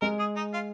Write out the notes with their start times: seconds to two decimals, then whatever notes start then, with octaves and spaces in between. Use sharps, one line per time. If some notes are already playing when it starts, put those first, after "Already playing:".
0.02 G#3 A#4
0.19 G#4
0.37 D#4
0.54 F4